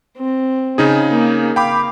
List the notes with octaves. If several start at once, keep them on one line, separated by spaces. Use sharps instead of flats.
C4
C#3 D#4 G#4
A#3
F5 G5 B5 D6